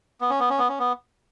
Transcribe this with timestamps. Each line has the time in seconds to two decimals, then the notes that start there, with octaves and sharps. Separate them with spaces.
0.21 B3
0.30 C#4
0.40 B3
0.50 C#4
0.59 B3
0.69 C#4
0.79 B3